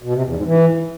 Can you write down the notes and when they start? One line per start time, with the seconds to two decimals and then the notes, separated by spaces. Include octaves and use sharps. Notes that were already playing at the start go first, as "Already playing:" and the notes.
0.03 B2
0.13 C3
0.24 E2
0.35 G#2
0.46 E3